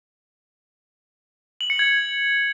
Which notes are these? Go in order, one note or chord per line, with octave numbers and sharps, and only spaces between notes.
F#7
C#7
G#6